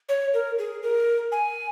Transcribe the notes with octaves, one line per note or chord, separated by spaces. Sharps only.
C#5
A#4
G#4
A#4
G#5